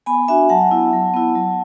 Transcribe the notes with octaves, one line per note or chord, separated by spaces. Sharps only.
B3 G#5 B5
D4 F#4 E5 G#5
F#3 F#5 A5
B3 E4
F#3
B3 E4
F#3